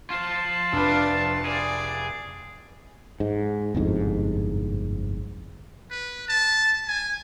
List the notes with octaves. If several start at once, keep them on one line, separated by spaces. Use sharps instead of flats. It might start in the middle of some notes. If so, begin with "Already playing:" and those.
F4 C5 F5 A5
F1 D4 B4 D5
G#4 D5
G#2
G1 C2 F2 G#2
B4
A5
G#5